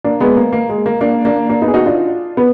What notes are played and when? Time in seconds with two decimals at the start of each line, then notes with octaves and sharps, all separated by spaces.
0.04 A#3 D4
0.20 G#3 B3
0.37 A#3
0.52 A#3
0.69 G#3
0.86 A#3
1.01 A#3 D4
1.25 A#3 D4
1.49 A#3 D4
1.62 B3 D#4
1.68 G#4
1.74 D#4 F#4
1.86 D4 F4
2.37 B3